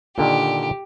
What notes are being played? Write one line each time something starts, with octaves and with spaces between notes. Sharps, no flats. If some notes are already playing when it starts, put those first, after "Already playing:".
A#2 D3 D#3 G4